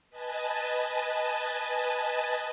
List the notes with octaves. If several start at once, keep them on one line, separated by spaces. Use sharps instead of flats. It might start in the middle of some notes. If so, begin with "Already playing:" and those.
B4 D#5 G#5 A5